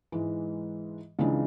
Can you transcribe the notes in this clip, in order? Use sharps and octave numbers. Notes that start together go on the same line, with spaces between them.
G#2 E3 G#3
C#2 C#3 E3 G#3 D4